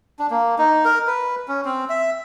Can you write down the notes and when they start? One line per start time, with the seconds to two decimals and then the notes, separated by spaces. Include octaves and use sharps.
0.19 D4
0.30 A#3
0.58 D#4
0.85 A#4
1.07 B4
1.48 C#4
1.65 C4
1.89 E5